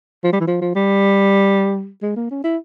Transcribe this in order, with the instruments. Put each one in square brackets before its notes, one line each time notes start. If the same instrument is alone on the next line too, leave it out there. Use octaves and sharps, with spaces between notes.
[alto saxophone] F3
G3
E3
F3
F3
G3
G#3
A#3
C#4
E4